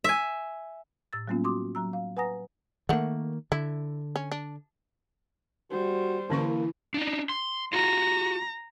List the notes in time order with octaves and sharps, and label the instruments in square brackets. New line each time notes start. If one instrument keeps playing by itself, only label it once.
[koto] E5 G#5
[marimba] A2 E6 A6
F#3 G3 A#3 B3 C#4 F4
F#4 C6 D6 D#6
F#3 A#5 E6
F5
B4 F#5 G#5 A#5 D#6 A#6
[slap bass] D#3 A#3 [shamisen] A3 F#5
[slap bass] D3 [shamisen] E4
[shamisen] C#4
D4
[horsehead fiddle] G3 C5 [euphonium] F#4
[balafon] D3 C#4 C#6 [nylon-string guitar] E3 [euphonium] A#3
[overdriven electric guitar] D4 D#4
C6
[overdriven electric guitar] F4 F#4 [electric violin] A#5